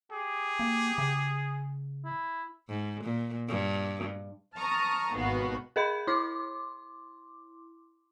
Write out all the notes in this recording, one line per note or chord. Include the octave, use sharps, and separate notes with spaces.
G4 G#4
A#3
C#3
E4
G#2
A#2
G2
A5 A#5 C#6 D#6 F6
G#1 D#2 B2 B3 F#4 F5
G#4 A#4 D#5 B5 G6
E4 C6 D6